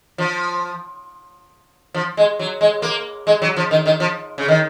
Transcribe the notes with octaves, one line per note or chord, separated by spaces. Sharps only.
F3
F3
G#3
F#3
G#3
A#3
G#3
F#3
F3
D#3
D#3
F3
C#3
D#3